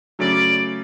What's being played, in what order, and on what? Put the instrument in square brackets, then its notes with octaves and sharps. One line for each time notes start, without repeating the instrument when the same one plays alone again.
[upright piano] C#3 F#3 A3 C#4 [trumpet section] D5